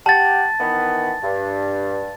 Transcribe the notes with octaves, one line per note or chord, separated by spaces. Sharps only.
G4 F#5 A5 A6
D#3 E3 B3
G2